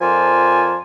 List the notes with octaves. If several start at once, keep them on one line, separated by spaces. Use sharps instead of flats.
F2 F3 A#4 C5 D5 G#5